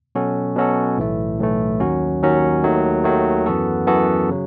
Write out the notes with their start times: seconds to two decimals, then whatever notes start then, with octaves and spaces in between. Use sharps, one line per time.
0.15 B2 F#3 C#4 F#4 A4
0.56 B2 F#3 C#4 F#4 A4
0.98 B1 A2 E3 A3
1.39 B1 A2 E3 A3
1.80 D#2 D#3 F#3 C#4 F#4
2.22 D#2 D#3 F#3 C#4 F#4
2.63 D#2 D#3 F#3 A3
3.04 D#2 D#3 F#3 A3
3.46 F#2 E3 B3 F#4 A4
3.87 F#2 E3 B3 F#4 A4
4.30 C#3 F#3